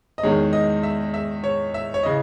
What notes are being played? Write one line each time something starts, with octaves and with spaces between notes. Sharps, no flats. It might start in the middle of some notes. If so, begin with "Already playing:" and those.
D#5
E2 D#3 G#3 C#5
D#5
E5
E5
C#5
E5
C#5
C#3 E3 D#5